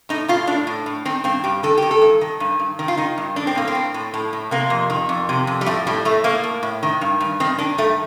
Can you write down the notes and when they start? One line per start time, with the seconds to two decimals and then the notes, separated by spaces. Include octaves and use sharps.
0.09 A2 D#4
0.28 A2 F4
0.47 A2 D4
0.67 A2
0.86 A2
1.05 D#3 C4
1.24 G2 C4
1.44 G2 G4
1.63 D#3 A4
1.77 D#3 G4
1.91 A4
2.02 G2
2.21 D#3
2.40 G2
2.59 G2
2.79 D#3
2.88 F4
2.97 D#3 D#4
3.18 G2
3.36 A2 D4
3.47 C4
3.55 A2 A#3
3.68 C4
3.75 A2
3.94 A2
4.14 A2
4.33 A2
4.51 C3 A#3
4.70 F2
4.90 D#3
5.09 F2
5.29 C3
5.47 F2
5.61 G3
5.66 A2 A3
5.87 A2 G3
6.05 A2 A3
6.24 A2 A#3
6.44 A2
6.63 A2
6.83 D#3
7.01 G2
7.21 G2
7.40 D#3 C4
7.59 D#3 D4
7.78 G2 A3